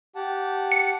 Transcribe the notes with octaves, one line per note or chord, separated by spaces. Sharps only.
G4 F#5 A5
C#7